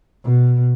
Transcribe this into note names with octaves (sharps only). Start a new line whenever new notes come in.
B2